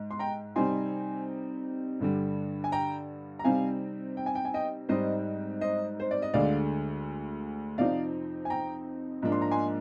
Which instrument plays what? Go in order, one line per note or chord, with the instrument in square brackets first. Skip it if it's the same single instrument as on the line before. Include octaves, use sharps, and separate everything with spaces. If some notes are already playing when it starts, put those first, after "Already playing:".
Already playing: [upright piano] G#2
C6
G5 A#5
C3 G3 C4 D#4 G#5 C6
G2 D3 G3
G#5
G5 A#5
A#5
C3 G3 C4 D#4 F5 G#5
G5
G#5
G5
G#5
D#5 G5
G#2 G3 C4 D#4 C5 D#5
C5 D#5
C5
D5
D#5
D2 D3 G#3 D5 F5
F2 C3 F3 C4 D#4 D5 F5
G#5
G5 A#5
G#2 F3 A#3 D4
C6
A#5
G#5 C6